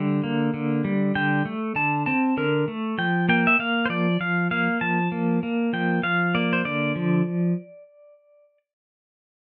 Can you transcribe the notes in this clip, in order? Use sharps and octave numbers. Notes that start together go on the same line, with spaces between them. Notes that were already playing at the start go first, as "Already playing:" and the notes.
Already playing: D3 G3 E5
A#3
D3
G3
D3 G5
A3
D3 A5
C4 A5
D3 A#4
A3
F3 G5
A#3 G5
E5
A#3 F5
C5
F3 D5
F3 F5
A#3 F5
F3 A5
A#3
A#3
F3 G5
F3 F5
A#3 D5
C5
D3 D5
F3